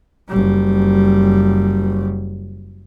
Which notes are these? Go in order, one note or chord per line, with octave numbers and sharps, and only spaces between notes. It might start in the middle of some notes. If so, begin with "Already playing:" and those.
F#1 G3